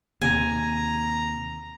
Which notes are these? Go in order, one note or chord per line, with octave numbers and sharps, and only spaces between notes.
D#2 C3 G#5 A#5